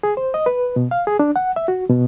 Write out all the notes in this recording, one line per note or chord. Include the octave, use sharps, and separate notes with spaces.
G#4
C5
D#5
B4
B2
F5
G#4
D4
F#5
E5
F#4
B2